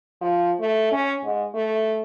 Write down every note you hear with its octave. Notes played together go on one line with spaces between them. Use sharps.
F3
A3
C#4
G#2
A3